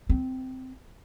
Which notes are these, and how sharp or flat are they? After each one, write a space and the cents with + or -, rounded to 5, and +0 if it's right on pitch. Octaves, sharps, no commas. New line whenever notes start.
C4 -15